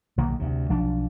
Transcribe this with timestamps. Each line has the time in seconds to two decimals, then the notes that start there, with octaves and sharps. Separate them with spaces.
0.18 B1 D#3 A#3
0.39 D2 C3
0.69 B1 F3 D4